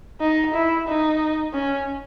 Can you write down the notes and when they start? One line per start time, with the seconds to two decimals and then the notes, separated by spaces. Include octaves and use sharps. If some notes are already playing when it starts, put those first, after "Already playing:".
0.21 D#4
0.54 E4
0.88 D#4
1.53 C#4